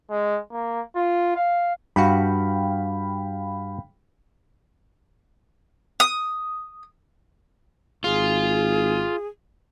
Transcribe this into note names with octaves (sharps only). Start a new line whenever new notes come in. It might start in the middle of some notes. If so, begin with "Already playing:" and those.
G#3
A#3
F4
F5
G2 F#4 F5 G5 B5
D#6
G#1 F4 G#4